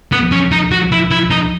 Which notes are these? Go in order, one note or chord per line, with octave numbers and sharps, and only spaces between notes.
B3
C#4
D#4
F#4
E4
E4
D#4